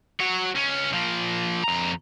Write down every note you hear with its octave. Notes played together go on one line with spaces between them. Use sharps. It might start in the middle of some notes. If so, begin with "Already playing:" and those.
F#3 C#5
C#2 C#4
F3 A#3
F2 A#5